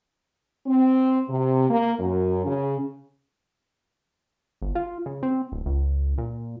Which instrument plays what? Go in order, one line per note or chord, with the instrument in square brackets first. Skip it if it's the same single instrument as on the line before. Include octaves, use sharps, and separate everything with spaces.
[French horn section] C4
C3
A#3
F#2
C#3
[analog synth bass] G1
F4
C#3
C4
D1
C#2
A#2